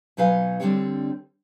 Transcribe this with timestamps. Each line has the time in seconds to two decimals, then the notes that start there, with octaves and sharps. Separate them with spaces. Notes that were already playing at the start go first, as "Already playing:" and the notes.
0.17 B2 F#3 D#4 B4 F5 G#5
0.60 D3 G3 C4 D4 G4 C#5